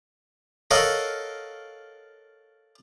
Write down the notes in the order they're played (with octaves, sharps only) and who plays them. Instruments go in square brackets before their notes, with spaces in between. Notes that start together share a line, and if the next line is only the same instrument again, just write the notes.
[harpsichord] A4 A#4 C#5 D#5 F5 F#5